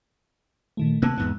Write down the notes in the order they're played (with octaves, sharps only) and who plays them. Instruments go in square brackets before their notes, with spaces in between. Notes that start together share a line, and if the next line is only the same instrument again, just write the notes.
[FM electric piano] A#2 D#3 A3
[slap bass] C3 A#3 B3 [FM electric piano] A5 E6 F#6
[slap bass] E2 G#2 B3